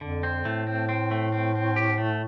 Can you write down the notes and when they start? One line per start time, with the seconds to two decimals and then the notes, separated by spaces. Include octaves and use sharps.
0.01 F2 D3
0.23 C4
0.45 A2 A3
0.67 C4
0.89 C4
1.11 A3
1.32 C4
1.55 C4
1.76 G4
1.98 A3